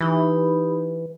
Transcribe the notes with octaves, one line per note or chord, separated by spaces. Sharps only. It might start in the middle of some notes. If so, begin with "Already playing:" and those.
E3 D#4 G4 B5